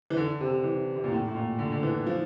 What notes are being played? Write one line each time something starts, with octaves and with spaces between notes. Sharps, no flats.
E3
D3
C3
E3
C3
A#2
A2
A2
A#2
D3
D3
E3
F3